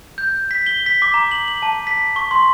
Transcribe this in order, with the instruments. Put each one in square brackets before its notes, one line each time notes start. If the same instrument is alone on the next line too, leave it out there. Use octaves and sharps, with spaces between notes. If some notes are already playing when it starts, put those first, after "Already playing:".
[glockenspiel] G6
B6
G7
B6
D6
A#5
F#7
F#7
A5
B6
C#6
C6